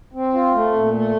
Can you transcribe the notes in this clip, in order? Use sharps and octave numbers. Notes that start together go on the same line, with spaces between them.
C4
F4
A3
A#2
A3